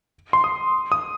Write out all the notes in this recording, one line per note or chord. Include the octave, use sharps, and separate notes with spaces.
C6
D#6
D#6